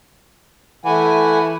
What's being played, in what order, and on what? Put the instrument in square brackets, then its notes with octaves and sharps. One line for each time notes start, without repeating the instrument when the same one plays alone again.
[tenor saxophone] E3 [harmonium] A3 F#5 G#5